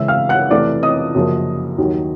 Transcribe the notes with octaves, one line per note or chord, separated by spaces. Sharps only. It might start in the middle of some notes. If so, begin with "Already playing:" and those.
Already playing: C#3 E3 G#3 C#4 E5 E6
F5 F6
F#5 F#6
F2 C3 E3 A3 D5 D6
D#5 D#6
F#2 C#3 F3 A#3
D#2 D#3 F#3